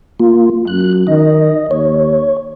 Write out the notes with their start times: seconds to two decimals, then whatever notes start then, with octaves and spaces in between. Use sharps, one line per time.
0.20 A#3 F4
0.67 F#2 F#6
1.07 D#3 D#5
1.71 D#2 C#5